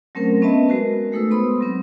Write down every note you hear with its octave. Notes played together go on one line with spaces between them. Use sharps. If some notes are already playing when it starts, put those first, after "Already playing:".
F#3 A3 C4 C#4 A#4 C5
B3 C#4 B4 D#5 E5 A5
G#3 F#4 A#4
G#3 A3 D#4 A4 B4 E6
B3 C5 B5 C6 D#6
F#3 C4